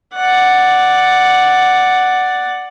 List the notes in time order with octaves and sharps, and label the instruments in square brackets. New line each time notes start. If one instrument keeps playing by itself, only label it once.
[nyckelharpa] D5 F#5